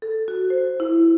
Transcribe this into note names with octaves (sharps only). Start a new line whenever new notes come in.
A4
F#4
C5
E4